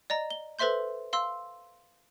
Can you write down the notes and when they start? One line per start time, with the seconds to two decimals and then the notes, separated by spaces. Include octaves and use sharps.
0.10 D5 D#5 A#5
0.30 G7
0.59 A4 B4 C5 E5 C6 G6
1.13 F5 C6 E6